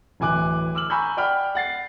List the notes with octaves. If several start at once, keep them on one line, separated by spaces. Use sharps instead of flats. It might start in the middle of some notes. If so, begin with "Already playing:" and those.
D1 E3 G#5 D6 F#6
D6 E6 F6 F#7
G#5 A#5 B5 C#6 E6 G6
D5 F#5 G5 B5 F6
F#5 A6 C7